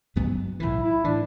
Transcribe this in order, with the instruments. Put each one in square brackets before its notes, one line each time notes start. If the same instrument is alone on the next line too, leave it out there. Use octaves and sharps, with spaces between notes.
[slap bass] G1 G2 F#3 B3
[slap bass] B1 A2 E3 [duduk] E4
[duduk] E4
[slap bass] A2 E3 [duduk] D4